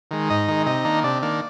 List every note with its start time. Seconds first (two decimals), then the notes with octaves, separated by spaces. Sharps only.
0.11 D#3 G#3
0.30 G#2 D#4 D#5
0.48 D#3 G#3
0.66 C3 D#4 D#5
0.85 D#3 A#3 D4
1.04 C3 D4 D5
1.22 D#3 A#3 D4